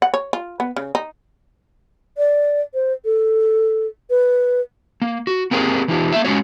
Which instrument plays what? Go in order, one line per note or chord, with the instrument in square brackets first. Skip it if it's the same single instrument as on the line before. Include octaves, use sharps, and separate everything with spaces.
[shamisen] F#5
C#5
F4
B3
C#3
D#4
[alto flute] D5
C5
A4
B4
[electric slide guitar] A#3
F#4
A#3 C4 G4 G#4 A#4
E3 D#4 F4 G4
A#3 E5
G#3 C#4 F#4 C#5